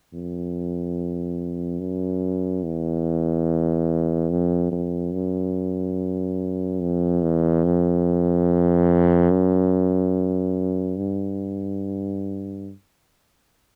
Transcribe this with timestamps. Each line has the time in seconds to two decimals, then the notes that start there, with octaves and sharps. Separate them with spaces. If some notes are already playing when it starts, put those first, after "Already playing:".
0.13 F2
1.80 F#2
2.63 E2
4.30 F2
4.72 F2
5.14 F#2
6.80 F2
7.22 E2
7.64 F2
9.30 F#2
10.97 G2